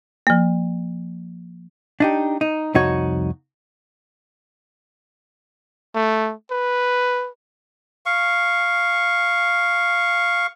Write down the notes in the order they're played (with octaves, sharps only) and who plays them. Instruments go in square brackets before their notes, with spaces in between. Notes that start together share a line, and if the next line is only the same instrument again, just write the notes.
[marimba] F3 A#3
[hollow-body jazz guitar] D4 D#4 G4
D#4
C2 F2 D#4 F#4 C#5
[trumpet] A3
B4
[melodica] F5 C#6